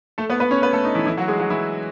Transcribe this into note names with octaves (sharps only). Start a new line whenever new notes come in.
A3 A4
B3 B4
B3 B4
C#4 C#5
B3 B4
A3 A4
D#4
E3 E4
E3 E4
F#3 F#4
G#3 G#4
F#3 F#4
E3 E4